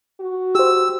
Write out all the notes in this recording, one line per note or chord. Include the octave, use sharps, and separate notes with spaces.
F#4
G4 C5 E6